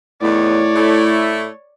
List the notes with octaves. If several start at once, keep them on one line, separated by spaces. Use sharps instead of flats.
E2 A2 D#3 B3 C#5 D5
A3 E4